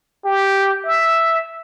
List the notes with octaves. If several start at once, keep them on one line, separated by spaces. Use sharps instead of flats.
G4
E5